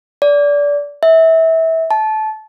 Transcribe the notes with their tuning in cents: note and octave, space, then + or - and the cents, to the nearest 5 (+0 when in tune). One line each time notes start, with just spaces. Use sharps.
D5 -25
E5 -25
A5 -20